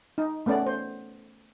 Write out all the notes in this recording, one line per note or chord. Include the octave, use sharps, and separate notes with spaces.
D#4
A3 B3 C#4 D5
C5